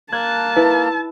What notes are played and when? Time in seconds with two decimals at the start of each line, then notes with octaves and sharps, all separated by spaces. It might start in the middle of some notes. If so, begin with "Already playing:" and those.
0.12 A#3 A5 F#6 G#6
0.56 E4 B4